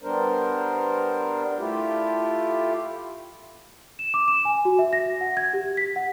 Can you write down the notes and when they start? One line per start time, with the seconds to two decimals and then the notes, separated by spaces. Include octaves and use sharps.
0.03 G3 B3 D4 A#4 C5
1.58 A3 E4 F4 G4
3.99 E7
4.14 D6
4.28 E7
4.45 G#5
4.65 F#4
4.79 E5
4.93 A#6
5.21 F#5
5.37 G#6
5.54 G4
5.77 B6
5.96 F#5